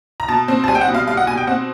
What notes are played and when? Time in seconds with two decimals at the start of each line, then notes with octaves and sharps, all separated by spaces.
0.20 A#5
0.28 B2 A5
0.48 C4
0.64 A5
0.68 G3 G#5
0.75 G5
0.81 F#5
0.88 B2
0.94 F5
1.07 G3 F5
1.17 F#5
1.27 B2 G#5
1.37 G5
1.47 C4 F#5